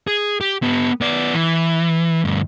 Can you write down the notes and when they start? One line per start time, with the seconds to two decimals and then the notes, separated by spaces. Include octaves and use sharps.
0.07 G#4
0.41 G4
0.63 B3 G4
1.01 B3 D5
1.34 E3
2.25 D2 G2